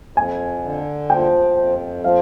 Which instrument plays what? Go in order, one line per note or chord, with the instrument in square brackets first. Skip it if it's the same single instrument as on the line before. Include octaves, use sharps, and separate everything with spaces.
[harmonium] F2 [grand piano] G#5
[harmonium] D3
[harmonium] F3 [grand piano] G5
[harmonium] F2
[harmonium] F3 [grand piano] F5